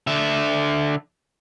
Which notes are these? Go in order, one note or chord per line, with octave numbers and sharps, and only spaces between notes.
D3 E5